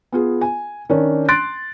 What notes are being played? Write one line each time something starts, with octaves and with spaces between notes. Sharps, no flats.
B3 F4 G#4
G#5
D#3 C#4 D4
C6 F#6 A6 D7